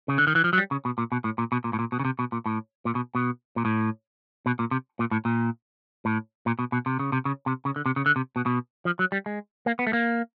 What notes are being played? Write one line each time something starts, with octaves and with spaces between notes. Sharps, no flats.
C#3
D3
D#3
E3
F3
F#3
G3
C#3
B2
A#2
B2
A2
A#2
B2
A#2
A2
A#2
B2
C#3
C3
B2
A#2
A2
A#2
B2
B2
A#2
A2
B2
A#2
C3
A#2
A2
A#2
A2
A#2
B2
B2
C3
C#3
C3
C#3
C3
C#3
D3
C3
C#3
D3
C3
B2
B2
F3
F#3
G3
G#3
A#3
B3
A3
A#3